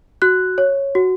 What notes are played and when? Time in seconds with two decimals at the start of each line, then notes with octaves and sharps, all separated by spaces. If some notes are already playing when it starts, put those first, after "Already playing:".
0.22 F#4 F#6
0.58 C#5
0.95 F#4